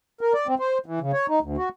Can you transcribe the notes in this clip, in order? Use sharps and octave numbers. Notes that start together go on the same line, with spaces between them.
A#4
D5
C4
C5
E3
C#3
C#5
D#4
D2
F#4